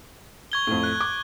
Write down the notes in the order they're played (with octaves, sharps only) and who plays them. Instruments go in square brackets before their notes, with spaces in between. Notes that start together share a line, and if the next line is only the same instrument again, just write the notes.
[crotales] C#6 G#6 G7
[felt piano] F2 A2
[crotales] F#6
[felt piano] D6